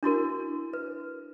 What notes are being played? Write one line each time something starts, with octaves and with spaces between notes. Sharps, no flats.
D4 E4 F#4 A#4
B4